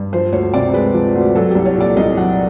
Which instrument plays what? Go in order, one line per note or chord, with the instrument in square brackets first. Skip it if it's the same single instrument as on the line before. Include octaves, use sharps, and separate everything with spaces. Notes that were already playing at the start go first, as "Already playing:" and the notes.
Already playing: [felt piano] G2
F3 C5
D2 C#5
C3 D5
G#3 B4
F3
D2
F#3 A4
C2 G4
C#5
A#2
D5
C2 D#5
F#3 F#5